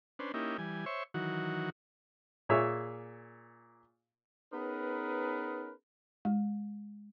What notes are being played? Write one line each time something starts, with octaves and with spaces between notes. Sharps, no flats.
C#4 D4 B4 C5
A#3 C#4 D#4 E4 G4
E3 G3 G#5
C5 C#5 E5 C#6
D#3 E3 F#3 F#4
A#2 G#4 C#5 E5
B3 C#4 D#4 G#4 A#4 B4
G#3